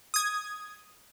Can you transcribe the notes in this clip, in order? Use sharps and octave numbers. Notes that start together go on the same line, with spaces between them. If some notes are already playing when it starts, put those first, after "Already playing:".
D#6 G#6